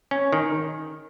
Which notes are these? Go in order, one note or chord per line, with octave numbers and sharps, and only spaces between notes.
C#4
D#3